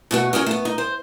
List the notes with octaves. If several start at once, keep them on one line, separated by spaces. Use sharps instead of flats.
B2 A3 F#4
C#4 F#4 G#4 A#4
A3 B3
D#4
C5